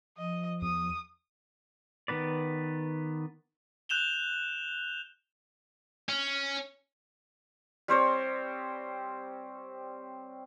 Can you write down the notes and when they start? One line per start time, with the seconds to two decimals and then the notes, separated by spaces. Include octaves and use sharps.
0.17 F3 D#5
0.62 E2 D#6
2.08 D#3 B3 B4 D5
3.89 F#6 G6 E7 F7 G7
6.09 C#4
7.88 G3 C4 C5 C#5